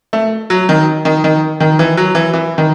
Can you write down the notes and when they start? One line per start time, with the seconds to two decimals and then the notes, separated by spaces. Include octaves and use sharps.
0.13 A3
0.50 F#3
0.69 D#3
1.05 D#3
1.24 D#3
1.60 D#3
1.79 E3
1.97 F#3
2.15 E3
2.34 E3
2.58 D#3